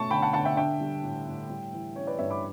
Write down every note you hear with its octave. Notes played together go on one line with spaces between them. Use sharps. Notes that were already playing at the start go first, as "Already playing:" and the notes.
Already playing: B2 A3 C#4 A5 C#6
D3 G5 B5
F#5 A5
D3 F#5 A5
E5 G5
D4 E5 G5
G3
A2
A2
G3
E3
C#4 C#5
B4 D5
G2 C#5 E5
B5 D6